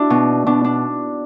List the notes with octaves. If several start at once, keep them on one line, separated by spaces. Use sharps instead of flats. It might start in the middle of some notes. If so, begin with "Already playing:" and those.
Already playing: D4 E4 F#4
B2
B2 D4
D4